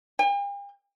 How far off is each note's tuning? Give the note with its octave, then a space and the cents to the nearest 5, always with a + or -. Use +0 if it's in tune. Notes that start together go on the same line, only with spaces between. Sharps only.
G5 +45